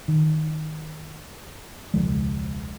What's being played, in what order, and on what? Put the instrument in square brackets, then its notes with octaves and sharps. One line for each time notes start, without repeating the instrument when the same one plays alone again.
[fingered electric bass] D#3
E1 C#2 F3 G#3